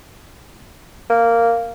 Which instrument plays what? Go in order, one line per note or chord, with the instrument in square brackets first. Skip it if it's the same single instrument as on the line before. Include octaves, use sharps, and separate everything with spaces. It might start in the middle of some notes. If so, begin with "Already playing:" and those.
[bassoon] A#3